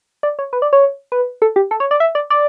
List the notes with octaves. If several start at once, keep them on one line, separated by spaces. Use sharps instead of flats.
D5
C#5
B4
D5
C#5
B4
A4
G4
A4
C#5
D5
E5
D5
D5